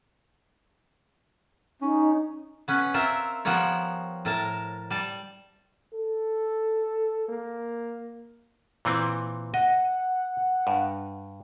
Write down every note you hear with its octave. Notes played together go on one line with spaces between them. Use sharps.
C#4 D#4
B3 C#4 B4
C4 F4 A#4 E5
F3 G3 B3 A#4 C#5
A2 A#4 A5
G3 A5
A4
A#3
A#2 E3 C4
D#5 F#5
G2